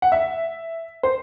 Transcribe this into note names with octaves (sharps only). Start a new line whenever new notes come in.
F#5
E5
C5